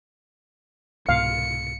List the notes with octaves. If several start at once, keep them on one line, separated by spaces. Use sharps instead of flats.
C2 G#2 B2 F5 C#7